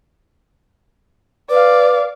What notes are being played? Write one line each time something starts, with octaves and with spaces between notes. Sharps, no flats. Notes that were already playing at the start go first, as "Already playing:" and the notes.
B4 D5 F5